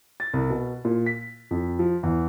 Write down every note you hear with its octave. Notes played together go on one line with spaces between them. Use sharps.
A6
C2
B2
A#2
B6
F2
F3
E2